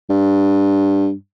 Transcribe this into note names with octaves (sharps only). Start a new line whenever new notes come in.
G2